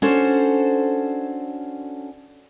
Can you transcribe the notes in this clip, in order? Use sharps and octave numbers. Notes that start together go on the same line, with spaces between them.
C#4 D4 F#4 A4 C5